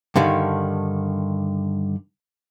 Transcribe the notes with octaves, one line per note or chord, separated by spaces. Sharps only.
G2 D3 D#3